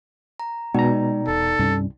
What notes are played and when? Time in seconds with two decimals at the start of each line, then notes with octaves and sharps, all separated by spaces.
0.40 A#5
0.74 B2 G#3 D#4 D5 G5 A#5
1.28 E1 A4
1.59 C2 G2 G3 C#4